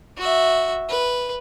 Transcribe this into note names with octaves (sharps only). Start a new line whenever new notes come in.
F#4 E5
B4